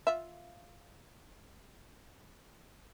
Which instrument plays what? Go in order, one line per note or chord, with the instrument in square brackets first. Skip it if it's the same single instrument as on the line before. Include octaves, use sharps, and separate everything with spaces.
[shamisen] F4 E5